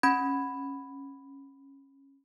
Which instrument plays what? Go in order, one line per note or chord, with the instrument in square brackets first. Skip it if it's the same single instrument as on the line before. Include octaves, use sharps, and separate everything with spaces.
[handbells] C#4 B5 G#6